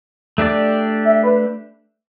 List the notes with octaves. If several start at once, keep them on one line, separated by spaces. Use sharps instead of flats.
A3 D4 G4 D5
E5
B4